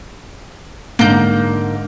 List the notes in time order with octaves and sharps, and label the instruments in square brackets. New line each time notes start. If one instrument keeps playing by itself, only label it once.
[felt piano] G#2 D3 [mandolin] A#3 G6